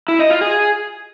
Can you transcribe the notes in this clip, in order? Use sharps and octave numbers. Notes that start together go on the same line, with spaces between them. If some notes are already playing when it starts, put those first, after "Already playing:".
E4
D#5
F4
G#4